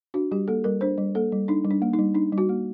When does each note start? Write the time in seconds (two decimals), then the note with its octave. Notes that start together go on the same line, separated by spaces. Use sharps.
0.14 D4 F#4
0.32 G3 G4
0.48 A#3 A4
0.64 G3 A#4
0.81 D4 C5
0.98 G3
1.15 A#3 A4
1.32 G3
1.48 D4 D#4
1.65 G3
1.70 D4
1.82 A#3
1.93 D#4
1.99 G3
2.15 D4 D#4
2.32 G3
2.38 F#4
2.49 A#3